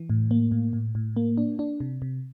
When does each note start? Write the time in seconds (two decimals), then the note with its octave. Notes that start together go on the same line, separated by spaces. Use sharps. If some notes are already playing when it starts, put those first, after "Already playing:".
Already playing: E3
0.10 A2
0.31 A#3
0.51 A2
0.73 A2
0.95 A2
1.17 A#3
1.38 D4
1.59 D4
1.80 C3
2.02 C3